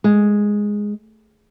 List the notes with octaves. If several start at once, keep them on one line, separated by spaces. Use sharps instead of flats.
G#3